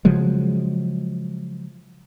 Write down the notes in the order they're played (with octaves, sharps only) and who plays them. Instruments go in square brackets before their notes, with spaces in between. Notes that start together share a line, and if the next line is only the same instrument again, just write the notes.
[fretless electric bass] C#3 F3 F#3 G#3